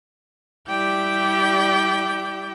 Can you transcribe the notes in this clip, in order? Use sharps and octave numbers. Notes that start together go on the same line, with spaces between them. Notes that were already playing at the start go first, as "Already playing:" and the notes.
G3 E4 G4 D5 G5 G6